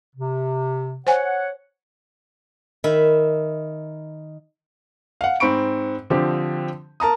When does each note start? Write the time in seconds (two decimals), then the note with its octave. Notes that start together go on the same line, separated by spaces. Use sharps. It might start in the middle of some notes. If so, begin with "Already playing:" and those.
0.16 C3
1.07 C5 C#5 F#5 G#5
2.84 D#3 E5 B5
5.21 F5 F#5
5.40 G#2 C4 B5 C#6 D7
6.10 D3 F3 C4 G4
7.00 A#4 A5 A#5 D#6